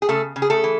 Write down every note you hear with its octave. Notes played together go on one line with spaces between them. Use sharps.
G#4
C#3 A3 A4
C#3
G#4
A3 A4
E3